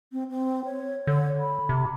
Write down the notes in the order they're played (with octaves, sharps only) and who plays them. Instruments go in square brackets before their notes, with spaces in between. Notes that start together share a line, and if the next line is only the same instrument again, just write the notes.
[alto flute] C4
C4
C#5
[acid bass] D3 [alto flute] C#5
[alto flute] B5
[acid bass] C3